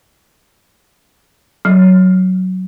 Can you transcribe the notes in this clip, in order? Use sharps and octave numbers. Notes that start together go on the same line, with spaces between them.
F#3